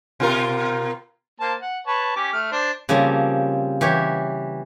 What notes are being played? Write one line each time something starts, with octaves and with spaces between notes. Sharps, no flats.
B2 F4 A#4
A#3 C5 A5
F#5
B4 C#5 A5
C#4 G4 D6
A3 F6
D4 C5
C#3 F3 G3 A#3 C4
E3 G4 C#5